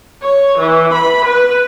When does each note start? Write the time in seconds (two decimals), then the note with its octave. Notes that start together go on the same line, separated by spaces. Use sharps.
0.22 C#5
0.58 E3
0.93 B5
1.25 B4